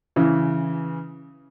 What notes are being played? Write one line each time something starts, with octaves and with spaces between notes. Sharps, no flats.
C#3 E3